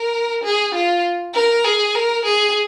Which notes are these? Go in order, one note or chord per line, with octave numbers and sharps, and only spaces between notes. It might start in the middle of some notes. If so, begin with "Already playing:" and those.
Already playing: A#4
G#4
F4
A#4
G#4
A#4
G#4